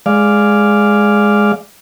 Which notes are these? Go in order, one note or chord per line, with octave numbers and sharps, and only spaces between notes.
G#3 D5 F5